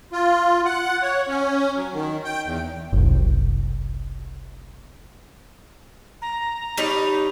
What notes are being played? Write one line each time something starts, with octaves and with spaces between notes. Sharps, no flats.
F4
F#5
C#5
C#4
F#3
D#3
G5
E2
F#1 C2
A#5
G3 D#4 C#5